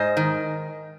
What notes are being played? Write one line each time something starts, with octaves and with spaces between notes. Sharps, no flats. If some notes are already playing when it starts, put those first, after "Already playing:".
Already playing: G#2 C5 D#5
D#3